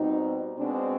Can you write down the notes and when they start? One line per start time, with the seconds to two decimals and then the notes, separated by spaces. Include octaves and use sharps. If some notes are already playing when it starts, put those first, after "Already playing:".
Already playing: B2 G3 C4 D#4
0.57 B2 G#3 C4 D4